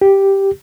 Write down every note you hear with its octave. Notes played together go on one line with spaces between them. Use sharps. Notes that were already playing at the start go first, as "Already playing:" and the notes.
G4